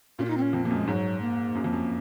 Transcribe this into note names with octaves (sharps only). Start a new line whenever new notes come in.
A#2 C#4
F4
D#4
C4
C#4
F2 C4
F2 A#3
F#2
G#3
G#2 F#3
A#3
F#2
F2
F#2